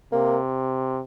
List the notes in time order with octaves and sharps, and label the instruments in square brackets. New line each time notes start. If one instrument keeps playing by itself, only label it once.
[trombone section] C3 [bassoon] A#3